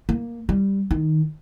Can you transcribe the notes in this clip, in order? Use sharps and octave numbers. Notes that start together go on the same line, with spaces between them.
A#3
G3
D#3